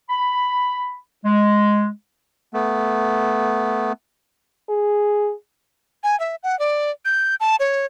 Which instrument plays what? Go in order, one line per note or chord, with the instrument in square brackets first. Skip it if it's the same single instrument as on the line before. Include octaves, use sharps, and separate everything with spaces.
[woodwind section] B5
G#3
[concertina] A3 B3
[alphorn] G#4
[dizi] G#5
E5
F#5
D5
G6
A5
C#5